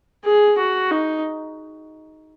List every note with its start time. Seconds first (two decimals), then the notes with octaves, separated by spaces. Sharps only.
0.24 G#4
0.58 F#4
0.91 D#4